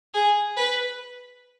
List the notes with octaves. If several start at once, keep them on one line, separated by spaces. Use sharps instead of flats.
G#4
B4